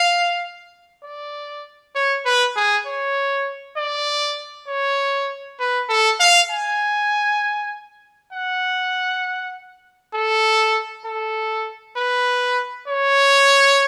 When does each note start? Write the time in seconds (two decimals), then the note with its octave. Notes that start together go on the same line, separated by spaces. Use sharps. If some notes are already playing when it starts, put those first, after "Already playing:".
Already playing: F5
1.04 D5
1.95 C#5
2.25 B4
2.56 G#4
2.86 C#5
3.77 D5
4.68 C#5
5.60 B4
5.89 A4
6.20 F5
6.50 G#5
8.33 F#5
10.15 A4
11.05 A4
11.97 B4
12.88 C#5